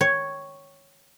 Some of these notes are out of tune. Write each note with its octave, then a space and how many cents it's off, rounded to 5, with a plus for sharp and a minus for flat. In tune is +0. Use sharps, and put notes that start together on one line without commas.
C#5 +0 G5 -10